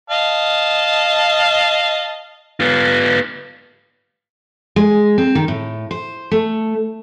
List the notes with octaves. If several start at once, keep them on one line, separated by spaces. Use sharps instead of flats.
D#5 F5 A5
B3 F4
G#3
C4
D#3
A2
C5
A3